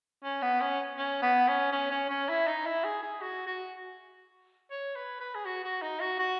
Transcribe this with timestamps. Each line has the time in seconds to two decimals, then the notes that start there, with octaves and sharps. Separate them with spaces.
0.24 C#4
0.42 B3
0.61 C#4
0.98 C#4
1.22 B3
1.48 C#4
1.72 C#4
1.91 C#4
2.10 C#4
2.29 E4
2.47 D#4
2.66 E4
2.84 G#4
3.02 G#4
3.22 F#4
3.46 F#4
4.71 C#5
4.95 B4
5.20 B4
5.35 G#4
5.45 F#4
5.64 F#4
5.82 D#4
6.01 F#4
6.19 F#4